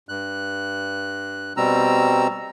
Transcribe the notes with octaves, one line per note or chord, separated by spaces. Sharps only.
G2 F#6
B2 G3 C4 A#5 E6